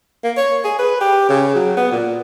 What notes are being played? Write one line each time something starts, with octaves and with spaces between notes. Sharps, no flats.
A#3
C#5
G#4
B4
G4
C#3
F#3
B3
A#2